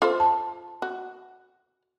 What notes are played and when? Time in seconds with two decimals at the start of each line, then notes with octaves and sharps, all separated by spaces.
0.02 F4 A4 C5
0.20 A5
0.82 F#4